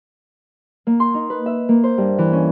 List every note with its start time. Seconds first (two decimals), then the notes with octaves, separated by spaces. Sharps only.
0.87 A#3
1.00 C6
1.14 D#4
1.30 B4
1.46 E5
1.69 A#3
1.84 C5
1.98 G2
2.18 E3
2.33 C#4